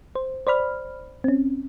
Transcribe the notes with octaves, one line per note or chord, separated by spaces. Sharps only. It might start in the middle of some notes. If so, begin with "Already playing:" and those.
C5
C5 D5 B5 F6
C4 C#4